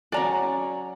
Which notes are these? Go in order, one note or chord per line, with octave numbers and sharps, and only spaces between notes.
F#3 C#4 D5 A#5